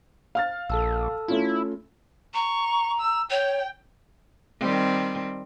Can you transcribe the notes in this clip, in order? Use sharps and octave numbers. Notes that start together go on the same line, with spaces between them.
F5 F6 A6
A#1 A4 A5 E6
A3 C#4 E4 F4
A#5 C#6
E6
C#5 G5
D#3 G3 C4